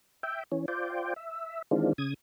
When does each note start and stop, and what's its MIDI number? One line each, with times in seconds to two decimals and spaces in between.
0.23 0.43 76
0.23 0.43 79
0.52 0.65 52
0.52 0.65 61
0.68 1.14 65
0.68 1.14 72
0.68 1.14 74
0.68 1.14 79
1.16 1.62 76
1.71 1.93 51
1.71 1.93 52
1.71 1.93 56
1.71 1.93 60
1.71 1.93 62
1.71 1.93 65
1.98 2.14 49
1.98 2.14 87
1.98 2.14 92